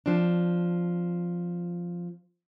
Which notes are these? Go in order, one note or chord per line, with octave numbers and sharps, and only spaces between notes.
F3 C4 D4